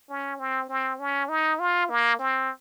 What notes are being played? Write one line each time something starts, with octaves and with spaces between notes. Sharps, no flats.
C#4
C4
C4
C#4
D#4
F4
A#3
C4